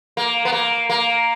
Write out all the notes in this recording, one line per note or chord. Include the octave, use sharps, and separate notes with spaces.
A#3
B3
A#3
A#3